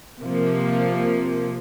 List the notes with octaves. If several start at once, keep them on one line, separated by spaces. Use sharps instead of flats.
C3 F3 A#3